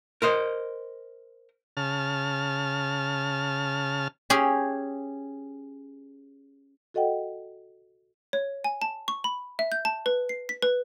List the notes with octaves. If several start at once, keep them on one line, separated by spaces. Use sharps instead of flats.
A#4 C5 D#5
C#3 A5 F6
C#4 G4 G#4
F#4 A4 D#5 F#5 G5
C#5
G#5
A5
C#6
B5
E5
G6
A5
B4
C7
B6
B4